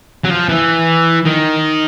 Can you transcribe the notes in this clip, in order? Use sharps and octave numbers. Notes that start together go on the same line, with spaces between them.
F#3
F3
E3
D#3